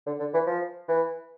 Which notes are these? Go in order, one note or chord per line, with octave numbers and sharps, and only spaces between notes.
D3
D3
E3
F3
E3